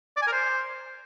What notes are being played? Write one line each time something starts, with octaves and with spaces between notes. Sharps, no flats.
D5
G#5
A#4
C5